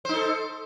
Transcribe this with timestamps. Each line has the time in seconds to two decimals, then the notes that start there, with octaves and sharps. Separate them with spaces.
0.05 C5
0.09 D#4
0.13 A4